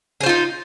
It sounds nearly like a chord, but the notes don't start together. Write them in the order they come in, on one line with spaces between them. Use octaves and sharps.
G#4 C5 F4 D#4